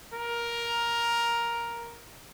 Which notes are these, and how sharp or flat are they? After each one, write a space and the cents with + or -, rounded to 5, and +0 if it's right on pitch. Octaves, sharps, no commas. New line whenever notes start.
A#4 +10